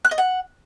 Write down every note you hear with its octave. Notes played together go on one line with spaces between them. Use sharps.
F#6
D#5
F#5